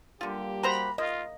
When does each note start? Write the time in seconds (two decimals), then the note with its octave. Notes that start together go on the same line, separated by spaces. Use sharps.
0.21 D3 G3 A#3 F4 G4
0.63 F#4 C5 F#5 A#5 B5
0.98 A#3 F4 D#5